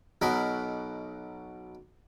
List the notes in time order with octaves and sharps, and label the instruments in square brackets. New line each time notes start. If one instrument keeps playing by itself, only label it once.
[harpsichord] B1 B2 F#3 A#4 D#5 B5